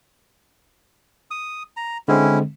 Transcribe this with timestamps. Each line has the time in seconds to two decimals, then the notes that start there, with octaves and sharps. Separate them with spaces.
1.31 D#6
1.77 A#5
2.08 D3 G#3 C4 C#4 E4